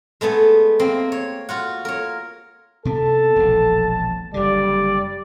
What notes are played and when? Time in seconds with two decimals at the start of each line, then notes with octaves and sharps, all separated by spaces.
0.21 G#3 A3 B3 G#4
0.79 A#3 C4
1.12 C#5
1.49 F4 F#4 F#5
1.85 A#4 C#5
2.85 C3 B3 A4 A5
3.36 E1 A#1
4.34 F#1 D3 G3 D5